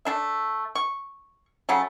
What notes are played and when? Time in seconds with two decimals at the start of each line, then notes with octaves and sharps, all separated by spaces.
0.05 A3 D4 E5
0.75 C#6
1.69 C#3 F#3 A3